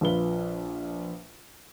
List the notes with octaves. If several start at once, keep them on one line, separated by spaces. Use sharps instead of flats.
A#1 F4 B4 G7